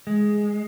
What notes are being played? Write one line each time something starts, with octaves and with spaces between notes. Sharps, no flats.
G#3